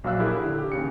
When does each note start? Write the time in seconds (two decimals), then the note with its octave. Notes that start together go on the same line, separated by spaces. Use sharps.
0.04 A#1 F#3 F5 E6 F#6
0.20 E4 G4 G#4 A#4
0.45 D3
0.59 G4
0.72 D#2 C#3 C#7